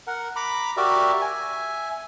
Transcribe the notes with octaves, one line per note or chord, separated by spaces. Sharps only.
A#4 F#5
A#5 B5 D6
F#4 G4 A#4 D5 E5
E5 G#5